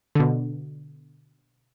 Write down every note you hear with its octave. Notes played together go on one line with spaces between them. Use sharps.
B2 D3